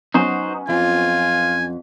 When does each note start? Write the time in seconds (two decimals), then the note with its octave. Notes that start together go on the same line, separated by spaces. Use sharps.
0.14 F#3 B3 C#4 D#4 F#4 C5
0.69 F2 F4 G#5